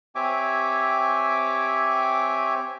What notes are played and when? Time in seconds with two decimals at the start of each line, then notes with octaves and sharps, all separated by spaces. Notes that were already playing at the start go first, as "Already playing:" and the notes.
0.15 C4 G4 C#5 E5 G#5 D6